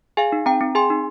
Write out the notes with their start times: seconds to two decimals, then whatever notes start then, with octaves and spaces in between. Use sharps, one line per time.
0.17 G#4 F5 G#5
0.32 D#4
0.46 C4 G5 A#5
0.61 C4
0.75 G#4 G#5 C6
0.90 D#4